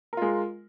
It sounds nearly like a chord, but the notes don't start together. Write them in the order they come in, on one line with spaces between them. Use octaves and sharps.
A#4 F4 G#3